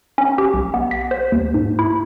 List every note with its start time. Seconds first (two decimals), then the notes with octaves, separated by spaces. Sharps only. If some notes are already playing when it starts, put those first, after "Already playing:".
0.18 C#4
0.38 G4
0.54 B1
0.74 B3
0.91 B6
1.11 C5
1.32 D#2
1.54 G#2
1.79 E4